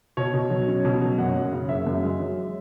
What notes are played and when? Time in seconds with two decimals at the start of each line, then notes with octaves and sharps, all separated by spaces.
0.17 B2 C#5
0.34 B2
0.50 F#3
0.68 C#4
0.85 B2
1.01 F#3
1.18 F#2 F#5
1.35 F#2
1.53 C#3
1.69 F#1 E5
1.87 F#2
2.03 G#3
2.20 F#3